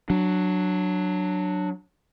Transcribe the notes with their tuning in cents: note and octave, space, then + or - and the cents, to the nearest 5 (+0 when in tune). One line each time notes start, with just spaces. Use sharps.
F#3 +0 D4 +10